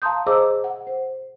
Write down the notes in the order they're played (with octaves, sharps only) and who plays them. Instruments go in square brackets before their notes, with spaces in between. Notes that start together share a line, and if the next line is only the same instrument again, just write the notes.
[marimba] F5 A5 A#5 C6 D#6 G6
G#4 C5 D#5 A#5 D6 E6
F#5
C5